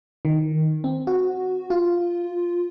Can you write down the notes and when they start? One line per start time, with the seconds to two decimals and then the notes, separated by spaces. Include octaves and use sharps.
0.25 D#3
0.84 C4
1.07 F#4
1.70 F4